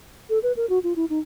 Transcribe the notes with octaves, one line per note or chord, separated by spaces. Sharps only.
A4
B4
A#4
F#4
F4
E4
D#4